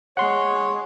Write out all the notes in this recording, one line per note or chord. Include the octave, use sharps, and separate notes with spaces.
G#3 G#4 C#5 F#5 C6